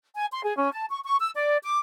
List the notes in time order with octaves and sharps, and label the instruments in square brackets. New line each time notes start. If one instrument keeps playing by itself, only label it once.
[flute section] G#5
C6
G#4
C#4
A5
C#6
C#6
E6
D5
D6